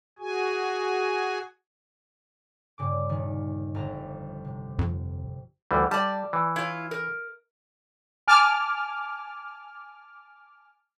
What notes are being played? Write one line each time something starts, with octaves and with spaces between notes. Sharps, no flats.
F#4 G#4 G#5
G2 C#3 D6
D#1 D#3
G1 F2 A#5
C3
F2
D2 E3 G3
G3 D5 A5
E3
E4 F4 C#5
A#4
G#5 A5 D6 F6